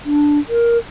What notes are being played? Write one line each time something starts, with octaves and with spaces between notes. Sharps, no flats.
D4
A#4